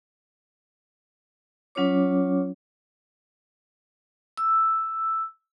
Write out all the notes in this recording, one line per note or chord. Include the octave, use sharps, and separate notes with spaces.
F#3 C#4 F4 C#5 D6
E6